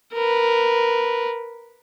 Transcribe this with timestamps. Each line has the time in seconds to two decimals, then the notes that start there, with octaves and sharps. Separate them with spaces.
0.13 A#4 B4